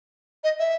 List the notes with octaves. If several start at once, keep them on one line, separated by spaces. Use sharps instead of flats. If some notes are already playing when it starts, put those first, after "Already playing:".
D#5
E5